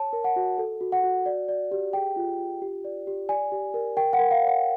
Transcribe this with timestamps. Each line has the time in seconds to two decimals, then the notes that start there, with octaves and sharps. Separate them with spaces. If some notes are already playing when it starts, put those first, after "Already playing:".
Already playing: C#5 A5
0.13 A#4
0.24 F#5
0.36 F#4
0.58 A4
0.81 F#4
0.92 F#5
1.03 F#4
1.26 D5
1.48 D5
1.72 G4
1.93 G#4 G5
2.16 F4
2.39 F4
2.62 G4
2.85 D5
3.07 G4
3.29 D5 G#5
3.52 G4
3.74 A#4
3.97 A#4 G5
4.13 F#5
4.19 A#4
4.31 F5
4.42 C#5
4.47 F#5